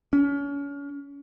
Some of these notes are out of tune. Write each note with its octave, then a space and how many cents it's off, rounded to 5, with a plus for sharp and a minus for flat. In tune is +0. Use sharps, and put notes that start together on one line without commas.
C#4 +35